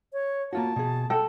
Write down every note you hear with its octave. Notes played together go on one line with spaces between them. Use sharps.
C#5
A#3 F4 F#4 A5
B2 G#4
A4 F#5 G5